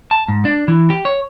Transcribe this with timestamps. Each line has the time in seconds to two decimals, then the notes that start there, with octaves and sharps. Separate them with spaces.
0.11 A5
0.28 G#2
0.45 D4
0.68 E3
0.90 G4
1.05 C#5